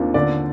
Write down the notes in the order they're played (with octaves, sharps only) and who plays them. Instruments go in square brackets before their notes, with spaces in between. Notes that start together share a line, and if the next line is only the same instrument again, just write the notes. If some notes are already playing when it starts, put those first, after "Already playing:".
Already playing: [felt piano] D#2 [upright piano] C4 D4 F4
[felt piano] D3 [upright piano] D5